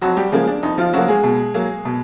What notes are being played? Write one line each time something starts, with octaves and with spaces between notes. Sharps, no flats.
F2 F#3 F#4
G3 G4
C#3 F3 G#3 A#3 G#4
D4
F2 D#4
F3 F4
C#3 F3 F#3 A#3 F#4
G#3 G#4
B2
F#3 A#3
B2